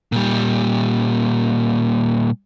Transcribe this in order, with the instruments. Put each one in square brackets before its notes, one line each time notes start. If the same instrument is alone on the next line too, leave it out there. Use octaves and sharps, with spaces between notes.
[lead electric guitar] A#2 G3